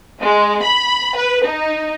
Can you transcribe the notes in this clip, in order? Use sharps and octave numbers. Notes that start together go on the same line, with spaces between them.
G#3
B5
B4
D#4